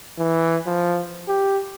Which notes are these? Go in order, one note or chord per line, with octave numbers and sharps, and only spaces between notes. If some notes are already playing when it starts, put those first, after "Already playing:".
E3
F3
G4